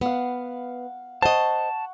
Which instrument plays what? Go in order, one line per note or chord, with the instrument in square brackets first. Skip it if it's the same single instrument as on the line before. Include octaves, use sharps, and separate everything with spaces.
[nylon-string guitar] B3 [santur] F5 F#5
[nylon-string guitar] C5 D#5 [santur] F#5 C#6 [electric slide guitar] A5